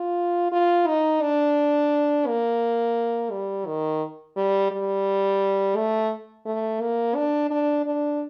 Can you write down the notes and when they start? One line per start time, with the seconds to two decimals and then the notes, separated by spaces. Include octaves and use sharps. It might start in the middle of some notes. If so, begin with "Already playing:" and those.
Already playing: F4
0.52 F4
0.87 D#4
1.22 D4
2.27 A#3
3.31 G3
3.66 D#3
4.36 G3
4.71 G3
5.76 A3
6.46 A3
6.81 A#3
7.15 D4
7.50 D4
7.86 D4